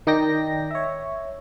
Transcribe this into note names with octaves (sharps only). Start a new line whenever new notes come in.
D#3 D#4 D5 G5 A#6
C#5 E5